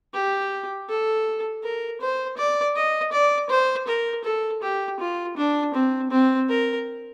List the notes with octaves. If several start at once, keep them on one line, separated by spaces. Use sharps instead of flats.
G4
A4
A#4
C5
D5
D#5
D5
C5
A#4
A4
G4
F4
D4
C4
C4
A#4